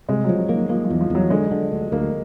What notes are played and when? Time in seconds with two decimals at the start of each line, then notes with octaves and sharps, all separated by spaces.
0.09 C3 G#3
0.24 F3 F#3
0.39 F#3
0.49 D#3 A#3
0.69 F3 A#3
0.84 F3
0.90 E2
1.01 F3
1.10 E2 F#3
1.30 D3 G#3
1.51 D3
1.72 D2
1.92 D2 A#3